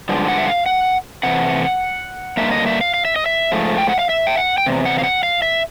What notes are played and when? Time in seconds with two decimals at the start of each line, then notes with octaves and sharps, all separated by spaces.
0.09 G2 D3 F3 G#3
0.28 F#5
0.38 E5
0.47 F5
0.66 F#5
1.23 C3 E3 A3 F#5
2.37 G2 D3 G3 A#3 E5
2.51 D#5
2.67 E5
2.81 F5
2.94 F5
3.05 E5
3.16 D#5
3.26 E5
3.52 G#2 F3 A3
3.78 G5
3.89 F#5
3.99 F5
4.09 E5
4.27 G5
4.37 F#5
4.58 G5
4.66 E2 C3
4.86 F#5
4.99 F5
5.04 F#5
5.23 F5
5.42 E5